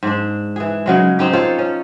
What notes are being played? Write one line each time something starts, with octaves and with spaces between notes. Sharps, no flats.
G#2 D4
E3 G#4
C#3 F#3 G#3
C4 D#4 G4
F4 A4 C5 C#5
C#4